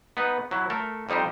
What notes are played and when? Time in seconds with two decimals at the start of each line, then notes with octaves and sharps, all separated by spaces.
0.17 B3 D#4 B4
0.51 F#3 E4
0.70 A3 A4 A#4
1.09 F2 G3 D#4 G4 C5